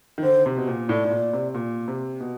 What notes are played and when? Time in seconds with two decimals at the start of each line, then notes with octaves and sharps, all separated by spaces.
0.18 D#3
0.23 D3 C5
0.46 C3
0.57 B2
0.68 A#2
0.89 A2 D5
1.05 A2
1.10 A#2
1.33 C3
1.55 A#2
1.88 C3
2.20 B2